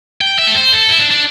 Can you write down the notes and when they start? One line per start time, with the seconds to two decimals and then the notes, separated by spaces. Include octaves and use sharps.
0.21 G5
0.39 E5
0.47 A4
0.56 C5
0.73 A4
0.89 E4
0.99 D4
1.11 D4